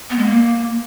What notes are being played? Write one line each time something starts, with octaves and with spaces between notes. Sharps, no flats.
B3
G#3
A#3